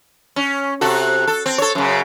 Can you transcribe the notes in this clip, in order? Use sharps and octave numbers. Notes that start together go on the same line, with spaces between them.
C#4
C3 F#4 A4
A4
C4
A4 C#5
F#2 C#3